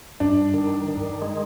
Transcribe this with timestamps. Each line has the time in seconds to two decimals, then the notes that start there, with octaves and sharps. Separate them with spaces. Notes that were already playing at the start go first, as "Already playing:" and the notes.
0.20 G2 D4
0.54 D#3
0.88 D#3
1.22 G#3